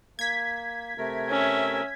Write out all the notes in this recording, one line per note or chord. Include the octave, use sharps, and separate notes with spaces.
A#3 G#6 B6
C3 A3 A#4
C#4 E5